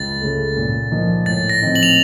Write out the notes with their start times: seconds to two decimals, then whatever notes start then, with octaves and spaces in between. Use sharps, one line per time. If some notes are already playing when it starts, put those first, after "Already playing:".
Already playing: C#2 A6
0.22 C#3 A3
0.57 A#2
0.91 F3 A#3 D#4
1.26 A2 A6
1.49 A#6
1.62 F3 C4 D#4
1.75 F#7
1.83 F7